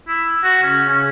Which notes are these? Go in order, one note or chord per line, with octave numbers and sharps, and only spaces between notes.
E4
F#4
C#3 C#4
C#4